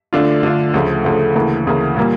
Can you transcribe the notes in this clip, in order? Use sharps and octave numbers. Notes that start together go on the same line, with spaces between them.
D3 A3 D4 F4
D3 A3 D4 F4
D2 C#3 F3 A3
D2 C#3 F3 A3
D2 C#3 E3 A#3
D2 C#3 E3 A#3
A#2 G3 A#3